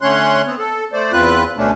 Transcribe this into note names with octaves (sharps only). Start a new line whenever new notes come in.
D3 A3 C#4 C#5 C6 F#6
B3 C4
A4
A3 C5 D5
E2 C4 F4 B4 F#6
D2 B2 A3 C#4 D4